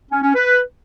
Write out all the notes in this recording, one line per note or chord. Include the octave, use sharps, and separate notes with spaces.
C#4
C#4
B4